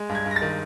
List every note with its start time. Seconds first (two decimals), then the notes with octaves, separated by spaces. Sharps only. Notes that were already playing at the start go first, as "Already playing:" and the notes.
Already playing: G#3
0.09 G2
0.15 G#6
0.26 G2
0.31 A#6
0.36 A6
0.42 D#3